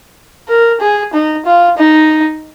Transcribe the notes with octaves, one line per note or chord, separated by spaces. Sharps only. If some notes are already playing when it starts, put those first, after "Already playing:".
A#4
G#4
D#4
F4
D#4